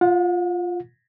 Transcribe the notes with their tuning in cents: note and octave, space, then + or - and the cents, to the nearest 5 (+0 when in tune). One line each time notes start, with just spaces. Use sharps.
F4 +0 F#5 -40